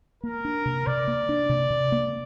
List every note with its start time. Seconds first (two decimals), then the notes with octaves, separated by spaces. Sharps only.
0.23 A#3 A#4
0.45 D4
0.66 C3
0.87 C3 D5
1.08 A#3
1.29 D4
1.49 C3
1.70 C3
1.92 A#3